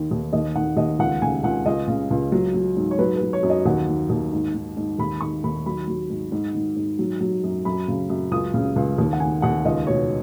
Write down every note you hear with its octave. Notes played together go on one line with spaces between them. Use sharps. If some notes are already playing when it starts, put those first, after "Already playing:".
Already playing: D#2 D#3
D#2
D#2 D#5
D#3 F#5
D#2 D#5
C#2 F#5
C#3 G#5
C#2 F#5
C#2 D#5
C#3
C#2
F#3
F#3
G#2
C#5
F#3 B4
B4
F#3
C#5
F#2
D#5
D#2 F#5
D#3
D#2
G#2
D#3
G#2
D#2 B5
D#3 C#6
D#2 B5
F#3 B5
F#3
G#2
G#2
D#3
G#2
F#3
F#3
F#2
F#2 B5
C#3
F#2
C#2 D#6
C#3
C#2
D#2
F#5
D#3 G#5
D#2 F#5
C#2 D#5
B2 C#5